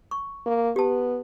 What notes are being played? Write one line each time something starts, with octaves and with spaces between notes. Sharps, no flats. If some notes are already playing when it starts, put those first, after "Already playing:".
C#6
A#3
B3 G4 A5